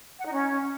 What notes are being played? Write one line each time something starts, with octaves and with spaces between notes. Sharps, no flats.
F#5
D#4
C#4